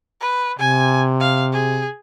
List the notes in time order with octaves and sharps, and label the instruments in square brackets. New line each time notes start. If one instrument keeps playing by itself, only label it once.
[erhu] B4
[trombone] C3 [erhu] G#5
[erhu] F5
G#4